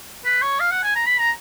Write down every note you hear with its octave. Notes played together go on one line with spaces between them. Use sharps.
B4
C#5
F5
F#5
G#5
A#5
B5
A#5